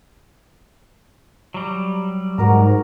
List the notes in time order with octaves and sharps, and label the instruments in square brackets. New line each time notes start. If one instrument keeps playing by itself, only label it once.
[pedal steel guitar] F#3 G3
[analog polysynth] G#2 [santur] F#4 A#4 A#5